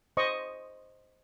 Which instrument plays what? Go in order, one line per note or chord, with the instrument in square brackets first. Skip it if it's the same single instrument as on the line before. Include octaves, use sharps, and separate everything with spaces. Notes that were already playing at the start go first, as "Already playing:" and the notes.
[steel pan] C5 D#5 C#6